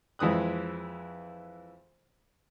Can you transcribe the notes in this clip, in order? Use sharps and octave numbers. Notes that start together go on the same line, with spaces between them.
F2 E3 G#3 D#6 F#6